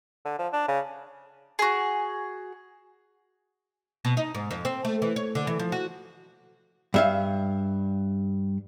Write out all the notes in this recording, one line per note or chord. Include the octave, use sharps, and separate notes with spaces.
D3
F3
D4
C#3
F#4 G#4
B2
D#4
G#2
F2
C4
A3
E3
C#5
D3
E3
F3
F#4
G2 E5 F5